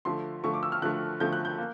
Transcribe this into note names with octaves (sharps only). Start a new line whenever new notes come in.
D3 F3 A3 C6
D3 F3 A3 C#6
D6
E6
F6
D3 F3 A3 F#6
D3 F3 A3 G6
F#6
G6
A#3